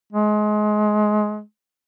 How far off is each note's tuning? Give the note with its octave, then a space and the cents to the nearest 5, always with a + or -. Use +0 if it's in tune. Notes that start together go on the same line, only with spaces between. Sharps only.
G#3 +25